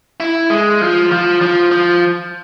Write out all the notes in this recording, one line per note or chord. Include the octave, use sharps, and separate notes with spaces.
E4
G#3
F3
F3
F3
F3